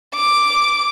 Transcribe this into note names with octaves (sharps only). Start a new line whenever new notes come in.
D6